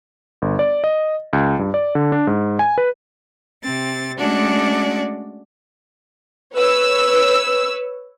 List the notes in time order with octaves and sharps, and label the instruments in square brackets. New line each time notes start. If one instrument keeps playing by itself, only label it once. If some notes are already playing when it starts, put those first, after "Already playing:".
[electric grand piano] G1
D5
D#5
C#2
G2
D5
D3
D4
G#2
G#5
B4
[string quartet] C3 C4 A6
G#3 A3 C#4 D4 F#4 D5
[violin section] B4 C#5 E6